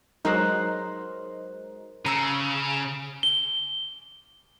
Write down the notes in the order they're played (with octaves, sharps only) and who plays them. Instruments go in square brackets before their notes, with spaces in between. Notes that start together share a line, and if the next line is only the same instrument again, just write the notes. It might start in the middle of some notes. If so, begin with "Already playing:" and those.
[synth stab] F#3 G#3 D#4 [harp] A#4 C5 F#6
[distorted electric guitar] C#3 [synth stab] A#5 E6
[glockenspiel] G7